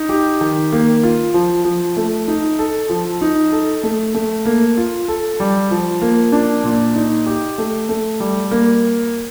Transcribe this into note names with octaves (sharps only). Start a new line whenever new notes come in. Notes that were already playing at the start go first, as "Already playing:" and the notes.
Already playing: D#4
G4
D#3
A#3
F4
F3
F3
A3
D#4
A4
F3
D#4
A4
A3
A3
A#3
F4
A4
G3
F3
A#3
D4
A#2
D#4
G4
A3
A3
G3
A#3